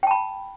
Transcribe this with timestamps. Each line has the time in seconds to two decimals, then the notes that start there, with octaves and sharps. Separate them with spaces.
0.03 G5
0.07 A5
0.11 B5